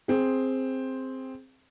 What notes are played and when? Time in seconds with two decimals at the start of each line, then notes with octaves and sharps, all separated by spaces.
0.08 C4 G#4